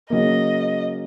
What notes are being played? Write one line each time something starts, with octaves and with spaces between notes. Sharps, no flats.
C#3 F#3 A#3 D#5